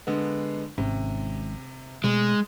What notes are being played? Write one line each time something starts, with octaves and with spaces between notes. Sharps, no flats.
D3 G#3 B3
G#1 G#2 C3 C#4
B2 G#3 A3